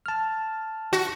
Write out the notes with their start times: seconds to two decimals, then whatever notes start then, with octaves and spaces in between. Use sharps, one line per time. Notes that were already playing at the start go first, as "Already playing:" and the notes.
0.06 A5 F6
0.93 F#4